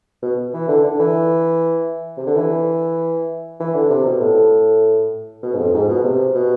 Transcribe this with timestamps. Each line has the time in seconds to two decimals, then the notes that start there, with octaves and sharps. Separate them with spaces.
0.22 B2
0.54 E3
0.69 D3
0.84 D3
1.00 E3
2.17 C3
2.27 D3
2.37 E3
3.60 E3
3.75 D3
3.90 C3
4.06 B2
4.20 A2
5.43 B2
5.54 G#2
5.59 F2
5.74 G#2
5.89 B2
6.04 C3
6.35 B2